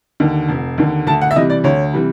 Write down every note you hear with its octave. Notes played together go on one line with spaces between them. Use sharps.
D#2 D3
F1
D#2 D3
D2 A5
F#5
E5
C3 E3 G3 D#5
D5
D2 C#5
C3 E3 G3